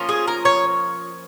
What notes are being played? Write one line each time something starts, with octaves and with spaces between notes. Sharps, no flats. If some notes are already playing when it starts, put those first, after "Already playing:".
Already playing: F3 A#3 C#4 F4
G#4
A#4
C#5